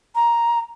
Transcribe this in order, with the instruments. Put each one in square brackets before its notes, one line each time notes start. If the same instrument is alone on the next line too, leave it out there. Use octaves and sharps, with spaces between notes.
[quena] A#5